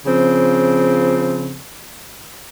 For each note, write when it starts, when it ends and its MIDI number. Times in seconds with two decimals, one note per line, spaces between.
0.06 1.58 49
0.06 1.58 53
0.06 1.58 60